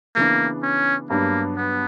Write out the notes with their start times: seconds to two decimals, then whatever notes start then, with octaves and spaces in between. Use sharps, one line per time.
0.16 C#3 E3 A#3 B3 D4
0.63 C#4
1.10 G2 F#3 A#3 B3 D4
1.57 B3